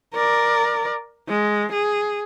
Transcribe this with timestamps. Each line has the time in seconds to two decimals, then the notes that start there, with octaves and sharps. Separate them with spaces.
0.14 A#4 D5
1.28 G#3
1.72 G#4